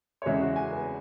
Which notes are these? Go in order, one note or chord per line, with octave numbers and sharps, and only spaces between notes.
C#5
E2 C#3 G#3 E5
F#4
G#5
B4